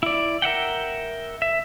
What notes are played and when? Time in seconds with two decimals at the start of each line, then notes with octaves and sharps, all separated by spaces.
0.03 E4 D5
0.42 A#4 E5 F#5 G5
1.42 E5